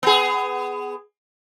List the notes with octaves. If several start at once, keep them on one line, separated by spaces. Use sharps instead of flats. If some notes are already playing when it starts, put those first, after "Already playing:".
B3 G#4